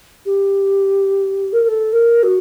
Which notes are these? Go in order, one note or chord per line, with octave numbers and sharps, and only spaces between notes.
G4
A#4
A#4
A4
A#4
F#4